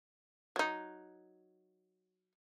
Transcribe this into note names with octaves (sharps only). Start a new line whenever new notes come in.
F#3 D#4